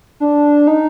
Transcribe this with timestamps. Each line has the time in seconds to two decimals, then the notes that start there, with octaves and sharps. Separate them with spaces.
0.20 D4
0.67 D#4